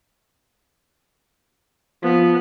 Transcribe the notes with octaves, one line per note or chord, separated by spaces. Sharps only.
F3 B3